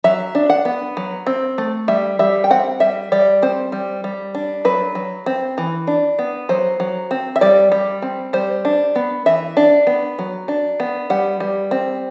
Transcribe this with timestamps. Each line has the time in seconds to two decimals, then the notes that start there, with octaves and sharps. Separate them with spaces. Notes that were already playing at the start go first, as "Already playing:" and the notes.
0.04 F#3 E5
0.35 D4
0.50 F#5
0.65 B3
0.97 F#3
1.27 C4
1.58 A3
1.88 G3 E5
2.19 G3 E5
2.44 G5
2.50 C4 F#5
2.80 G3 E5
3.12 G3 D5
3.42 C4 C5
3.72 G3
4.04 G3
4.35 D4
4.65 F#3 B4
4.95 F#3
5.26 C4
5.58 E3
5.87 D4
6.19 B3
6.49 F#3 C5
6.80 F#3
7.11 C4
7.36 E5
7.41 G3 D5
7.72 G3
8.02 C4
8.33 G3 C5
8.65 D4
8.95 B3
9.26 E3 E5
9.57 D4
9.87 B3
10.19 F#3
10.48 D4
10.80 B3
11.10 G3 F#5
11.40 G3
11.71 C4